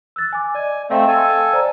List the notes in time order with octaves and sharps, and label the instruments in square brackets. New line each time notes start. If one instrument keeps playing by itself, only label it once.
[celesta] E6 F#6 A6
G#5 D6
[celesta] D5 D#5 [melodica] G#5
[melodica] A3 C4 [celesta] D#5 F5 G5
[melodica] A4 G#5
[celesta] C5 D5 A#5